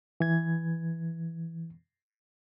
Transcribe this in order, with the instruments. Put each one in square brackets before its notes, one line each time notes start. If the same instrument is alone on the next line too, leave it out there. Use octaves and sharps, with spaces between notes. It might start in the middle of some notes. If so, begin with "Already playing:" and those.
[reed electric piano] E3 G#6